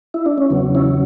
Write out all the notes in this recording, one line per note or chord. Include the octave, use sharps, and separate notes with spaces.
E4
D4
C#4
E2 C#3 F#3 B3
C#4 E4